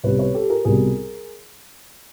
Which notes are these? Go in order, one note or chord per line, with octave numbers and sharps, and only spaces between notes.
C2 B2 G3 B4 C#5
B4 C#5
G4 A4
G#4 A#4
C2 B2 G3 G#4 A#4